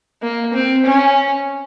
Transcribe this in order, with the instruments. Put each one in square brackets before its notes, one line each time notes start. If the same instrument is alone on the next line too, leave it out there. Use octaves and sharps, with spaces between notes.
[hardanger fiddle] A#3
C4
C#4